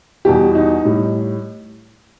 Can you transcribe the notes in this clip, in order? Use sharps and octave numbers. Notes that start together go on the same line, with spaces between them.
E2 B2 G3 G4
D#4
A2 G3